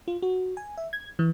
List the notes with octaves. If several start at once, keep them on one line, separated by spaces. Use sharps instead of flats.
F4
F#4
G#5
E5
G#6
E3